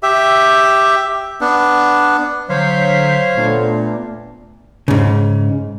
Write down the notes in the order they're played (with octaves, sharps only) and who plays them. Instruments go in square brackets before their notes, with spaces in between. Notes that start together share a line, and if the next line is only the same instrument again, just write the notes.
[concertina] G4 E5
B3 D4
[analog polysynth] D3 G6 B6 [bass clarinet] F#3 [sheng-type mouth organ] C5 C#5 F5
[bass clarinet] A#2 [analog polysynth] A3 B3 D4
[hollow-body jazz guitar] G#2 C#3